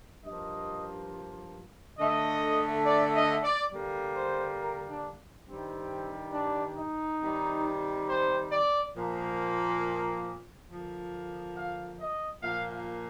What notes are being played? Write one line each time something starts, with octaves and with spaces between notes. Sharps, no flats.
G2 F3 A#3 D#5
D3 A3 D#5
D5
D#5
D5
D3 G3 A#3
C5
A#4
D4
G2 D#3 G3 C4
D4
D#4
C3 D#3 G3
C5
D5
A#2 F3 A#3
D3 F3 A#3
F5
D#5
A#2 F3 A#3 F5
F5